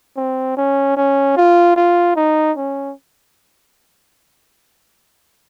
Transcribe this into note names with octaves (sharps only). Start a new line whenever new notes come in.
C4
C#4
C#4
F4
F4
D#4
C#4